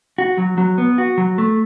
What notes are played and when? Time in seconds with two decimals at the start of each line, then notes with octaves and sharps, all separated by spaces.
0.18 F#4
0.38 F#3
0.58 F#3
0.78 B3
0.98 F#4
1.18 F#3
1.38 A3